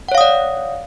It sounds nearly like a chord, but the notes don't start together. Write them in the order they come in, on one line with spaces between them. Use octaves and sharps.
F#5 C#5 F5 D#6 D5